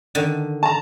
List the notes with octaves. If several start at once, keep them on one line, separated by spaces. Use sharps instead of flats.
D3 D#3
A5 A#5